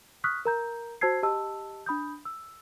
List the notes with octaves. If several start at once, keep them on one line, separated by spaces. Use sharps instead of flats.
C#6 D#6 F6 F#6 B6
A#4 A#5 G6
F#4 C5 A5 E6 G#6 C7
G4 D#5 A5 E6
D4 B5 D#6 G6
E6